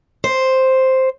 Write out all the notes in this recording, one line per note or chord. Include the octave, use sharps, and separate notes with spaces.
C5